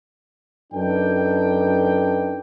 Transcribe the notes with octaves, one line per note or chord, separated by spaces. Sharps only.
F#2 D4 D#4 A4 B4 G5